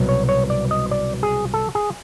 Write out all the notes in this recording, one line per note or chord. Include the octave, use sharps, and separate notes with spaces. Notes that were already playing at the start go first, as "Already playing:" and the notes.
Already playing: C2 B2 F#3
C#5
C#5
D5
D#5
D5
G#4
A4
G#4